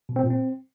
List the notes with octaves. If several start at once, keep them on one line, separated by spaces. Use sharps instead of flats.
B2
C4
A#2
C4